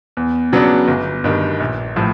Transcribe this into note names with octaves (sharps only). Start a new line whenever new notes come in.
E2
C#3 F#3 B3 D4
G1
G2 D#3
A#1
A2 F3